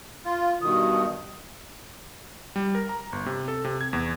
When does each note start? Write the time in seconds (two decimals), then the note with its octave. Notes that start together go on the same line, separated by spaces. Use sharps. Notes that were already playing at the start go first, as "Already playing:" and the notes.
0.25 F4 F5
0.61 G2 B2 D#3 D#6
2.56 G3
2.75 A#4
2.89 A#5
3.13 G1
3.26 C3
3.48 A4
3.65 C3
3.81 G#6
3.93 E2